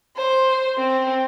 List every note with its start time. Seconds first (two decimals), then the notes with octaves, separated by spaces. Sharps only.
0.16 C5
0.78 C4